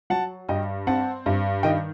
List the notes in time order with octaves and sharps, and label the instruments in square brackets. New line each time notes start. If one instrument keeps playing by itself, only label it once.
[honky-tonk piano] F#3 [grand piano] F#5 A5
[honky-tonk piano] G2 [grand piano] D#5 G5
[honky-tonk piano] C4 [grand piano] F#5 A5
[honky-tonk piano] G2
[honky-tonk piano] D#3 [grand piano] D#5 G5